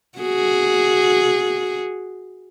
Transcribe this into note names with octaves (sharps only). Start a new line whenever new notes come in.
F#4 G#4